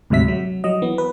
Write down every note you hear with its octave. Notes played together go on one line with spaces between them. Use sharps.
D2 G#2 C3 F#3 E5 B6
F#3
F#3 D#5
E3 B3
B4